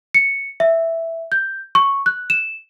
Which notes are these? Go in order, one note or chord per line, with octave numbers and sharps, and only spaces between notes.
C#7
E5
G6
C#6
F#6
E7